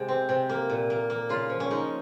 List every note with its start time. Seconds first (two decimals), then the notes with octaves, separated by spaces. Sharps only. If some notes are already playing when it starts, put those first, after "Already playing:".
Already playing: C3 G#3
0.08 C4
0.29 C3
0.49 A#3
0.70 A#2
0.90 A#3
1.10 A#3
1.29 C#3 F4
1.49 F3
1.60 C#4
1.71 G#3 D#4